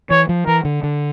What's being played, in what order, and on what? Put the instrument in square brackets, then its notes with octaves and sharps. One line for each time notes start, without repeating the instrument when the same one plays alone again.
[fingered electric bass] E3 [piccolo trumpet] C#5
[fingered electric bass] F3
[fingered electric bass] E3 [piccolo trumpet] A#4
[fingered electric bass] D3
D3